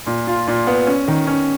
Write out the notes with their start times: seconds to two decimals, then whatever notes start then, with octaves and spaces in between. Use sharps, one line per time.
0.07 A#2
0.27 F4
0.47 A#2
0.67 B3
0.87 C#4
1.08 D#3
1.27 C#4